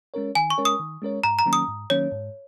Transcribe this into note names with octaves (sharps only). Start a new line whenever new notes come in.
G#3 C#4 A#4 C#5
D#3 G#5
C#6
G#3 C#4 A#4 C#5
D#6
D#3
G#3 C#4 A#4 C#5
G#2 A#5
A#5
D#3 F#3 A#3 C#4
D#6
G#2
D#3 F#3 A#3 C#4 C#5
G#2